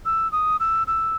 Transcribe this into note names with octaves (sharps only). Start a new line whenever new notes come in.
E6
D#6
E6
E6